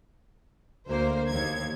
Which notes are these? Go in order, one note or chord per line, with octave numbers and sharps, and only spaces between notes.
D2 A#3 C5
D#2 G#6